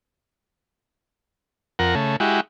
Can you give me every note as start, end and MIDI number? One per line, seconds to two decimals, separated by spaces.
1.79 1.95 41
1.79 1.95 70
1.79 1.95 78
1.95 2.16 49
1.95 2.16 57
2.20 2.40 56
2.20 2.40 64
2.20 2.40 66
2.20 2.40 67